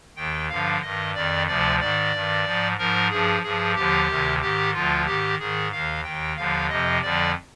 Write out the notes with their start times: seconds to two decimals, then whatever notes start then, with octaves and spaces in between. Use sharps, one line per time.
0.16 D#2 D#3 G5
0.49 G2 D3 F3 F5
0.81 G2 D#3 D#5
1.14 F2 D#3 D5
1.47 D2 C3 F3 D5
1.80 G#2 D#3 D5
2.12 G2 D#3
2.45 G#2 F3
2.78 G#2 F3 A#4
3.10 G2 F3 G#4
3.42 G2 G#4
3.48 F3
3.75 D#2 D3 F3 G4
4.08 D2 C3 D#3
4.41 G#2 D#3 G4
4.73 D2 D3 F3 F4
5.06 G#2 D#3 G4
5.39 G#2 D#3 G#4
5.72 D#2 D#3 F5
6.04 D#2 D#3 G5
6.37 D#2 D3 F3 F5
6.69 F2 C3 F3 D#5
7.02 F2 D3 F3 D5